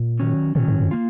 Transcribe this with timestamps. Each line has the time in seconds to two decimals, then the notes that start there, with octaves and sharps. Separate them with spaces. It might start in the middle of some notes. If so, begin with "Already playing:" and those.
Already playing: A#2
0.20 D#3 F#3 C#4
0.55 A#2 D#3 F#3 C#4
0.68 G#2
0.80 F#2
0.91 D#3 A#3 F4